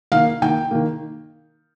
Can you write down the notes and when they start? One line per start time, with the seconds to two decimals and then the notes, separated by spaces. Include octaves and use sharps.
0.12 D#3 A#3 F5
0.42 D#3 A#3 G5
0.71 D#3 A#3